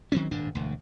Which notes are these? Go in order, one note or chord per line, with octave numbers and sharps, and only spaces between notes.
D#3 F#3 C4 C#4
D#1 G#1 G2 D4
E1 D2